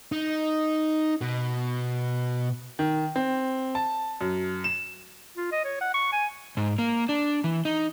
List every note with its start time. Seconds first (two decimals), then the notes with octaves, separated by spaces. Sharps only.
0.12 D#4
1.21 B2
2.79 D#3
3.16 C4
3.75 A5
4.21 F#2
4.64 E7
5.37 F4
5.52 D#5
5.65 C#5
5.81 F#5
5.94 C#6
6.13 G#5
6.57 G#2
6.78 A#3
7.09 D4
7.44 E3
7.65 D#4